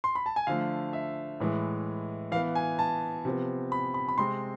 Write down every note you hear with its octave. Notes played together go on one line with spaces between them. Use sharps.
C6
B5
A5
G#5
D3 F3 A3 F5
E5
A2 E3 G#3
E3 B3 F5
G#5
A5
C3 F3 B3
B5
B5
B5
C3 G#3 C4 C6